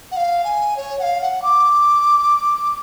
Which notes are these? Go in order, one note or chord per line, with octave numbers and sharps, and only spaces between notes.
F#5
F5
G#5
C#5
F#5
F5
F#5
D6